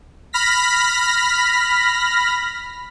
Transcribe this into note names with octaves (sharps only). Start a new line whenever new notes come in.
B5 F6 A#6 B6